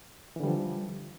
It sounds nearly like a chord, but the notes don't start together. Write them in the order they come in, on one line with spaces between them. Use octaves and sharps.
E3 D3 G3 F3